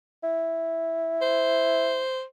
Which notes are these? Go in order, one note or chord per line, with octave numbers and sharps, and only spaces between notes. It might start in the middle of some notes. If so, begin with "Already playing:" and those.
E4
C5